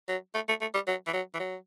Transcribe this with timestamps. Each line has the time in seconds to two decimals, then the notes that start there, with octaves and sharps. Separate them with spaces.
0.08 F#3
0.35 A3
0.49 A3
0.61 A3
0.74 G3
0.87 F#3
1.07 E3
1.13 F#3
1.34 E3
1.40 F#3